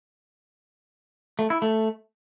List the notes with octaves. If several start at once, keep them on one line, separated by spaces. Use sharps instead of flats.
A3
E4
A3